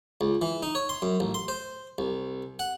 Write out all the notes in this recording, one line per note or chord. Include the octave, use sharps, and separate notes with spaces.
C#2
E3
D#4
C#5
C6
F#2
A1
C6
C5
C2
F#5